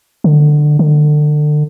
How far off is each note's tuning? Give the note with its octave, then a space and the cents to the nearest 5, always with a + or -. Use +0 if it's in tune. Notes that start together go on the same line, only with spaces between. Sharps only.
D3 +20
D3 +30